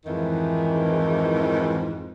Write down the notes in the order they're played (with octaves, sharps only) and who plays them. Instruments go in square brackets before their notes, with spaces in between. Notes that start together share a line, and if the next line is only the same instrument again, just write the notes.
[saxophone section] F2 G#2 D#3 E3